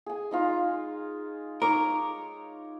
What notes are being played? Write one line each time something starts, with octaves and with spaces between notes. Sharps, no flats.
G#4 G#5
G#3 D#4 F4
D#4 A#4 C#5 D6